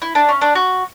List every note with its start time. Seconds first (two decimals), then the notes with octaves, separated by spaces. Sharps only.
0.02 E4
0.15 D4
0.29 C#4
0.41 D4
0.55 F#4